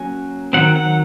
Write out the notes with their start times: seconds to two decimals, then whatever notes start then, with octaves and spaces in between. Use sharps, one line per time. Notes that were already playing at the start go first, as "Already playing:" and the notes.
Already playing: F#3 A#3 C#4 G#5
0.53 D#3 F#3 C4 F#5
0.76 F#5